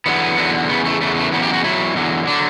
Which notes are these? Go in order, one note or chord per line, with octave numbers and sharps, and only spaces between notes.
E2 D3 F#3 B3
E2 D3 F#3
E2 C#3 B3
A3
E2 C#3 E3 A3
A3
E2 C#3 F#3 B3
G4
F#4
E2 C#3 F#3 E4
E2 D3 F#3
D3 F#3 D4